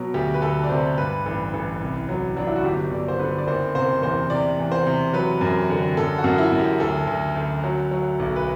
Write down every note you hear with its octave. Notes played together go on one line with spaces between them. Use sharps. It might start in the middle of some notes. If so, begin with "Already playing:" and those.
Already playing: B2 F#3
D2 G4
B4
D2 A4
D5
C3 C5
G2 B4
A1
A1
C2
F#3
F#3 D4
E4
F#4
G1 G4
G1 D5
C5
D3 B4
D5
F#1 C5
C3 C5
E2 C5
C3 D5
E2
C5
C3
F#3 B4
F#2
D3
F#2 A4
F#4
F#2
E4
F#2
G4
D2 A4
D2
D2
F#3
F#3
B1
B4